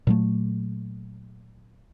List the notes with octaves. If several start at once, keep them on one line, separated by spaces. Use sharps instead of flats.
A#2 F#3 A3